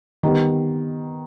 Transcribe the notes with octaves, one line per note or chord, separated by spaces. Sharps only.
D#3 G3 B3